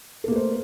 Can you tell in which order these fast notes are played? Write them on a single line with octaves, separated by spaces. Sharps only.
A4 A#3 A3 C5